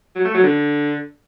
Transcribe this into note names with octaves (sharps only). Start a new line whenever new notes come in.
F#3
A3
F#3
D3